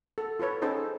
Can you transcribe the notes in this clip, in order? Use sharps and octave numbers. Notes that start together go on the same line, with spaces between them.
A4
F4 A4 B4 C#5
C#4 D#4 G#4 A4 C5 A5